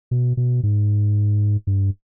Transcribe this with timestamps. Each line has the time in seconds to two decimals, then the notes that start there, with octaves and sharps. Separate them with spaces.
0.11 B2
0.37 B2
0.63 G#2
1.67 G2